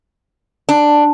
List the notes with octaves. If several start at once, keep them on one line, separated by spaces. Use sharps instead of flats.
D4